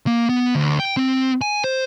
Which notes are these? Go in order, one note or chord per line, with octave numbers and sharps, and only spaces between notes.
A#3
B3
D2
G5
C4
G#5
C5